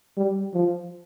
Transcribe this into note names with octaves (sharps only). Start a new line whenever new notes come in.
G3
F3